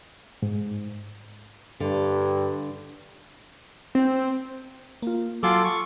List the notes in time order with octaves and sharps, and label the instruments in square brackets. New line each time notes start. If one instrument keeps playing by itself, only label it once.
[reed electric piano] G#2
[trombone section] G2 [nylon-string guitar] D3
[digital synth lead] C4
[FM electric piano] A#3 F4
[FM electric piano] F#3 G#5 C7 [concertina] F4 A4 D6
[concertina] C#6